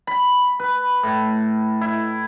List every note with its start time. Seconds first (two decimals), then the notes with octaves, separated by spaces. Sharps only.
0.07 B5
0.60 B4
1.03 A2
1.81 E4